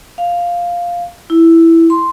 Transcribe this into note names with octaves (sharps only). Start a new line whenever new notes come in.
F5
E4
C6